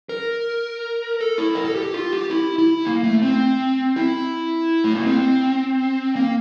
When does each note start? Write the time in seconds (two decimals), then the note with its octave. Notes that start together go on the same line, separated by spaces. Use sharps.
0.09 A#4
1.21 A4
1.38 E4
1.55 A#4
1.65 A4
1.75 G4
1.94 F4
2.12 G4
2.30 E4
2.58 E4
2.86 A#3
3.04 A3
3.22 C4
3.96 E4
4.84 A3
4.95 A#3
5.06 C4
6.16 A#3